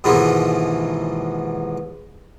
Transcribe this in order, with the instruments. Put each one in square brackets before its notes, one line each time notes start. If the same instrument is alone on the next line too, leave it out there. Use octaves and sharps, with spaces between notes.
[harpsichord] D#2 G#2 B2 E3 F3 B3